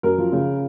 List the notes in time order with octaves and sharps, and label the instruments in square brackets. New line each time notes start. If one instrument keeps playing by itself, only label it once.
[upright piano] F#2 A#4
F3
C#3